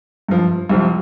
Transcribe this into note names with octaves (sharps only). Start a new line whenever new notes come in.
G2 F3
C2 C3 F3